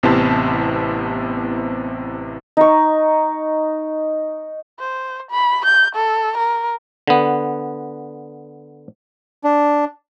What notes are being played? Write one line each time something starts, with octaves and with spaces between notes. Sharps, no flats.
A1 C3 B3 E4 C5 A5
D#4 C#6
C5
B5
G6
A4
A#4
D3 B3
D4